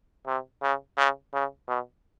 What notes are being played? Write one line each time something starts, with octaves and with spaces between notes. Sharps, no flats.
C3
C#3
C#3
C#3
B2